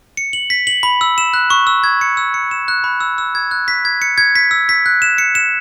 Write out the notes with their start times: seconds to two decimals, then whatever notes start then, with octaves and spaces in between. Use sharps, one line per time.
0.17 C#7
0.33 F#7
0.50 B6
0.67 F#7
0.83 B5
1.01 E6
1.18 E7
1.34 F#6
1.50 C#6
1.67 E6
1.84 G#6
2.01 C#7
2.17 E6
2.34 C#7
2.51 E7
2.68 F#6
2.84 B5
3.01 E6
3.18 E6
3.35 G#6
3.51 F#6
3.68 B6
3.85 G#6
4.02 C#7
4.18 G#6
4.35 B6
4.51 E6
4.69 B6
4.86 F#6
5.02 E7
5.18 C#7
5.35 E7